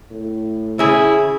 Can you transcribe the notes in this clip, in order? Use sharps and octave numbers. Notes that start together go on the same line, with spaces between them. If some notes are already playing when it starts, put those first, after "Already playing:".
A2
C#3 E4 G#4